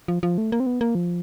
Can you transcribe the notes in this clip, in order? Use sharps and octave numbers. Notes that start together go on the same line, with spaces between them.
F3
F3
A3
A#3
C4
B3
A#3
F3